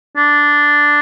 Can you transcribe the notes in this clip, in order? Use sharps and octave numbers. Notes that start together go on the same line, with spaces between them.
D4